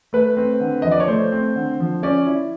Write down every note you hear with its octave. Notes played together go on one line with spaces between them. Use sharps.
A3 B4
C4
D3
F3 D#5
D5
C#5
A3 C5
C4
D3
F3
C#4 D5
E4